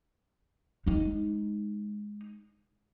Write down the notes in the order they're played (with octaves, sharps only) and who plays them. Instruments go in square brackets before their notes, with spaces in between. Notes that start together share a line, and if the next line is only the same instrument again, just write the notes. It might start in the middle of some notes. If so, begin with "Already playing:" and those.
[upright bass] G#3 D#4